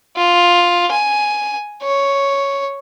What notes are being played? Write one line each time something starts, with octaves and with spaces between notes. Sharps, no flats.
F4
G#5
C#5